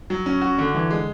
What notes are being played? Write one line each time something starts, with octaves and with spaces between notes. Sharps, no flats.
F#3
C#4
F#4
D3
E3
G#3